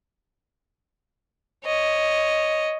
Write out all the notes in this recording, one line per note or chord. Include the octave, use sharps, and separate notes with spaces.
C#5 D#5